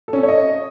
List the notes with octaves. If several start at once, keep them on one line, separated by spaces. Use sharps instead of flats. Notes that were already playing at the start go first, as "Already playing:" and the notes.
A4
C#4
A4
C#5
D#5